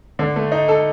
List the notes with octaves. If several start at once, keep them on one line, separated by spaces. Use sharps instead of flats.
D3
A3
D#4
A4